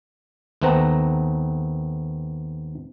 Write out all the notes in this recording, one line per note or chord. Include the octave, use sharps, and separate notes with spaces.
D#2 A3 B3 C4 F#5 A#5